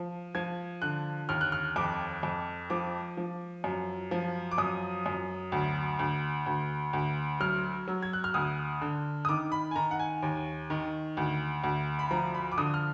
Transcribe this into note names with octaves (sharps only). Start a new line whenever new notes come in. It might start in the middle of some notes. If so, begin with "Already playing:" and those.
Already playing: F3
F3 G#6
D3 F#6
D#2 F6
F#6
F6
F2 D6
F2
F3 D6
F3
F#2
F3
D6
F#2 D#6
F#2
D2
D2
D2
D2
F#3 F6
F#3
G#6
F#6
F6
D2 D#6
D3
D#6
D#3 D6
B5
G#5
D#3 A#5
F#5
G#5
D#2
D#3
D2
D2
B5
F3 A#5
B5
D6
D3 D#6
F6